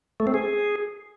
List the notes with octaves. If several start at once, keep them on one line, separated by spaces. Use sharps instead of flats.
A3
C4
G#4